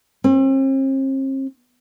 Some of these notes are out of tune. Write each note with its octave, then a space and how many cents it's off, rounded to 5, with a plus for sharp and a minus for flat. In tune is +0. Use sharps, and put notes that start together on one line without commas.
C4 +45